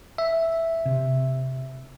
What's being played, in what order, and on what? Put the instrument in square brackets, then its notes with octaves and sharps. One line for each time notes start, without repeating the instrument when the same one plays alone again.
[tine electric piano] E5
[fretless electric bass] C3